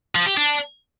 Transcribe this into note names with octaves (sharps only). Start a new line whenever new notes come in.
F3
G4
D4